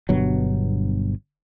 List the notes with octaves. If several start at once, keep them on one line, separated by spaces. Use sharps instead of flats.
G1 G2 B2 F#3